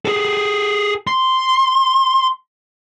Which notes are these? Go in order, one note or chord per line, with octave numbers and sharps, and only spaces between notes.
G#4 A4
C6